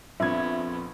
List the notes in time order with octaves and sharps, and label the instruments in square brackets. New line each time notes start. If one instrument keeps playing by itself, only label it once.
[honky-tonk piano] A#1 G#6 [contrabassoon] F2 [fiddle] B3 [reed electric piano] E5